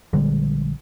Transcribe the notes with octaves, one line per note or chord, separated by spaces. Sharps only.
A#1 D3 G3 G#3